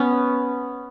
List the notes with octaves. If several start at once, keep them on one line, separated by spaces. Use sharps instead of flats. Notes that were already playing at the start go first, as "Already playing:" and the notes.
Already playing: B3 C#4